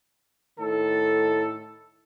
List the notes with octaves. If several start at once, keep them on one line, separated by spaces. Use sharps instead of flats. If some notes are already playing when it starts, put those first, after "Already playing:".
A2 D#3 A4